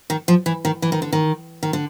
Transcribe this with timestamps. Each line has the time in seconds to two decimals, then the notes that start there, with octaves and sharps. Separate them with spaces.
0.10 D#3
0.28 F3
0.46 E3
0.65 D#3
0.82 E3
0.92 D#3
1.02 D3
1.13 D#3
1.63 D#3
1.73 D3